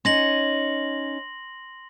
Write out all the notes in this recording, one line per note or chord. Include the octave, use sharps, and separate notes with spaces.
C#4 D#4 C6 A#6 F#7